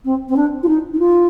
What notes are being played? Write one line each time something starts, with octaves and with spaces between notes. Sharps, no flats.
C4
C4
D4
F4
D#4
D#4
F4